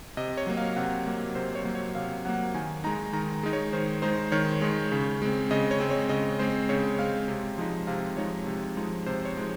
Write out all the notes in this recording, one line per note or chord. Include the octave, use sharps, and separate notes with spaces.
C3 D#5
C#5
F#3 A#3
F5
C3 F#5
F#3 A#3
C3 C5
C#5
F#3 A#3
C#5
C3 F5
F#3 A#3 F#5
D#3 G#5
G#3 D#4 A#5
D#3 A#5
G#3 D#4
C#5
D#3 C5
G#3 D#4 C5
D#3 C#5
G#3 D#4 C#5
C#3
G#3 C4
C#3 D#5
C#5
G#3 C4
C#5
C#3 D#5
G#3 C4 C5
C#3 C#5
G#3 C4 F5
C3
F3 G#3 D#4
C3 F5
F3 G#3 D#4 C#5
C3
F3 G#3 D#4
C3 C5
C#5
F3 G#3 D#4